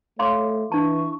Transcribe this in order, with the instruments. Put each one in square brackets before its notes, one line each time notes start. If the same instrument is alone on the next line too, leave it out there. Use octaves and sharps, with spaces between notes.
[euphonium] A3 [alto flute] C#5 [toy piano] F5 C6 D6
[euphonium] E3 [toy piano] D4 A5 [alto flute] C#6